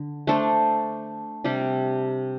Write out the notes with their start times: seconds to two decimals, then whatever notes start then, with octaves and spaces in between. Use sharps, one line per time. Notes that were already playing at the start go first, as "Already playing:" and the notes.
Already playing: D3
0.27 A3 D4 A4 C5
1.44 C3 G3 D4 G4